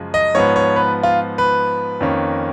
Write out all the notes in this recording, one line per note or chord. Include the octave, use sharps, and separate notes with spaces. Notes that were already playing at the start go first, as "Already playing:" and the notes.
Already playing: F#2 C#3 F3 G#3
D#5
G#2 F3 B3 C#5
C#5
B4
F4
B4
F2 D#3 A#3 C#4